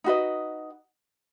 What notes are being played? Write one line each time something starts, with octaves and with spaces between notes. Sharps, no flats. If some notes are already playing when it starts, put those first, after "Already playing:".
D#4 F#4 B4 D#5